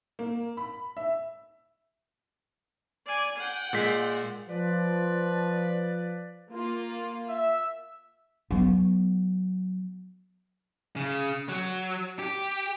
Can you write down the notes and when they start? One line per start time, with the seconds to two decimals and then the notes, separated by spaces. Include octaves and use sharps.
0.19 A#3
0.57 B5
0.97 E5
3.06 D5 G#5
3.37 F#5 G5
3.73 A#2 G#3 B6
4.49 F3 B4 D5
6.52 A#3 F4
7.29 E5
8.51 F#3 B3
10.96 C#3
11.49 F#3
12.19 G4